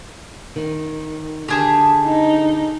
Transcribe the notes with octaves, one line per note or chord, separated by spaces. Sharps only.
D#3
D3 G4 G#4 A5
D#4